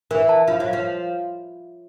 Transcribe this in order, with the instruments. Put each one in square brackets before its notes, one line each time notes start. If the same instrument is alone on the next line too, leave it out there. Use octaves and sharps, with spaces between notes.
[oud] E3 [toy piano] A#4
[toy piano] A5
[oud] F3 [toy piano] F4
[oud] F#3
[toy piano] F5
[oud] F3